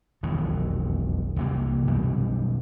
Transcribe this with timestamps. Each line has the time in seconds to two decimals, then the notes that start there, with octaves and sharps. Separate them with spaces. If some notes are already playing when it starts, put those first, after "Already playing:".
0.23 E1 B1 F2 D#3
1.36 C2 C3 G#3 A#3
1.87 F#2 B2 E3 G3